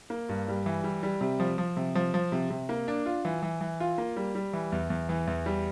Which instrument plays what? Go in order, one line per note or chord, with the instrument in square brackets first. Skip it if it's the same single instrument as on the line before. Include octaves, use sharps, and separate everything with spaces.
[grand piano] A#3
G2
G3
E3
G3
G3
C3
F3
F3
C3
F3
F3
C3
C3
A#3
D4
F4
E3
E3
E3
F4
A#3
G3
G3
E3
E2
E2
E3
E2
G3